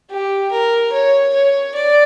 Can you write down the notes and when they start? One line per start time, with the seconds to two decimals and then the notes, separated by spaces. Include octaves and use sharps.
0.10 G4
0.51 A#4
0.93 C#5
1.34 C#5
1.75 D5